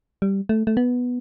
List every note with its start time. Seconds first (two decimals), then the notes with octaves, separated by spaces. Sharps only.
0.22 G3
0.49 A3
0.67 A3
0.77 B3